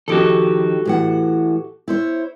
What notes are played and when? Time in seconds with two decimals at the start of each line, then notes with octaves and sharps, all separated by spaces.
0.08 D#3 F3 F#4 G4 A4
0.85 A2 E3 F#5
1.88 E4 C5 C#5